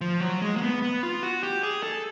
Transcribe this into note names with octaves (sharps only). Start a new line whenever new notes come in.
F3
F#3
G#3
A#3
B3
B3
F4
F#4
G4
G#4
A4